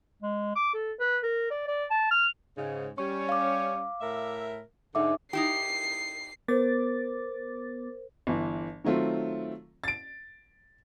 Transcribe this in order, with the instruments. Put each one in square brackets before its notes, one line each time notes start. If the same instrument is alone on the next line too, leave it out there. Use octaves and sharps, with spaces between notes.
[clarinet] G#3
D6
A4
B4
A#4
D5
D5
A5
F6
[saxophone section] G#2 C#3
[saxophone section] G3 C#4 [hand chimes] C#6
[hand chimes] F5 D6
[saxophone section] A2 A#4 E5
[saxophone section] G#2 D3 [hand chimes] D#4 E5 D6
[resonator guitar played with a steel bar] D#4 E4 G4 [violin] C7
[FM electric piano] B3 D6 A6 [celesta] A#4 C5
[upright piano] G1 E3
D#3 F#3 A3 C4 F4
A6 D7